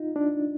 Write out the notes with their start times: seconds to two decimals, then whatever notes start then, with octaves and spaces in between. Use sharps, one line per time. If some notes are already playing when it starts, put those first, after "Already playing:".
Already playing: D#4 F4
0.16 D4